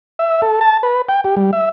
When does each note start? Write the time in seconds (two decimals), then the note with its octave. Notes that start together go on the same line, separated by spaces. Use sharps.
0.19 E5
0.42 A4
0.61 A5
0.83 B4
1.09 G5
1.24 G4
1.37 G3
1.53 E5